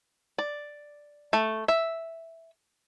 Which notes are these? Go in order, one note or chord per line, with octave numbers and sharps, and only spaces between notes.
D5
A3
E5